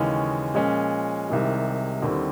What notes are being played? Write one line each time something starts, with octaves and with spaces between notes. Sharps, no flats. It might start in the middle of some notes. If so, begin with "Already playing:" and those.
Already playing: D#2 C#3 E3 G#3 C#4
A#2 F3 G#3 C#4
C2 C3 D#3 G#3
D#2 D3 G3 C4 E4